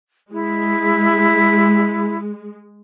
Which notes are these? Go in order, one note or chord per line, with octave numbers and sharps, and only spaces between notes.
G#3 E4